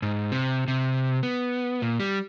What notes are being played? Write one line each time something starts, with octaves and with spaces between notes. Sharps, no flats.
G#2
C3
C3
B3
A#2
G3